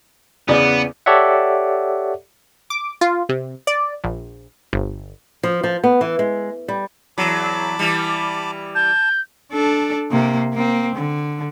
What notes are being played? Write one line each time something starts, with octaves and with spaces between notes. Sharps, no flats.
E2 C#3 B3 D5
G4 A4 C#5 D5 E5 F#5
D6
F4
C3
D5
A#1
G1
F3
F3
B3
E3
G#3
G3
E2 F#3 A5 B5 D6
E3 G3
A5 G6
D4 A4
C3 A#3
A#3 C4
D3